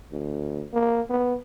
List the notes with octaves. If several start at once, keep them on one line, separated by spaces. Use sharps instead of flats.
D2
A#3
B3